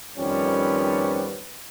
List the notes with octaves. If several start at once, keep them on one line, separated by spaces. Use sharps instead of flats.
F2 D#3 F3 G3 B3 C#4